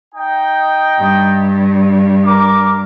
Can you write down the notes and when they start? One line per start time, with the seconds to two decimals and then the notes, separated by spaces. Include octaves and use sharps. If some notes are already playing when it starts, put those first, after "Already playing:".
0.15 D#4 D#5 G5
0.98 G2
2.26 A#4 D6